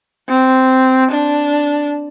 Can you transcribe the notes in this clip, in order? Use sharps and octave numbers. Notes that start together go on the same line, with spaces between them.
C4
D4